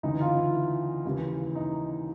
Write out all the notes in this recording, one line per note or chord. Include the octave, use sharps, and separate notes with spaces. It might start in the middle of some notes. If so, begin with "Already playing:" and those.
D2 C#3 E3 D#4
F4
E4
D#2 C#3 E3
D#4